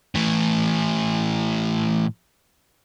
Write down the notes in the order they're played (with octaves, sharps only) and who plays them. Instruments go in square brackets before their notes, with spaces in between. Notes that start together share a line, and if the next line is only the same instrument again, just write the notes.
[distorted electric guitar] A2 E3